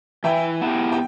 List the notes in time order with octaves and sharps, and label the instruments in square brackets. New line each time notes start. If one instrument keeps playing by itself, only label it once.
[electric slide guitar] E3 [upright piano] E5 G5
[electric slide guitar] B3 E4 G4
[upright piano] G5